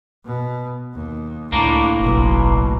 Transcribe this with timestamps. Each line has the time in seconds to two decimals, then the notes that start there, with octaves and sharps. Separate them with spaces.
0.25 B2
0.94 D#2
1.52 C#2 A2 A#3 D4
2.00 F#1 B1 B2